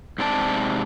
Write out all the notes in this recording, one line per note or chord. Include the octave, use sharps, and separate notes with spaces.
G#2 C3 C4 D5 A5